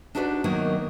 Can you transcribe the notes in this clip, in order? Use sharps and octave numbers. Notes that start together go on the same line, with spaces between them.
D4 D#4 F#4 B4 C5 D5
D#3 F#3 A#3 B3 D#4